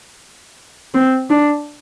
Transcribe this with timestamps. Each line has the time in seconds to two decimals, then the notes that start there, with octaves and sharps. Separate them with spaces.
0.94 C4
1.30 D4